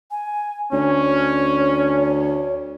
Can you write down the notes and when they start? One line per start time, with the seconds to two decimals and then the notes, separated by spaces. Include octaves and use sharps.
0.11 G#5
0.72 D2 C#4 C#5